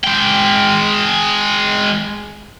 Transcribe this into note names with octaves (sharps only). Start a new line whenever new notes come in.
G#3 G5